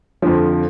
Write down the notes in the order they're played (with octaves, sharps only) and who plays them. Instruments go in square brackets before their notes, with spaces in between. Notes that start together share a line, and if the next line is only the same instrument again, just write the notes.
[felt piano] F2 D3 F3